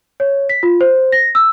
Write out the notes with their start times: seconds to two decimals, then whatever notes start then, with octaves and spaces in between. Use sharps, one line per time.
0.20 C#5
0.49 B6
0.63 F4
0.81 C5
1.12 A#6
1.35 E6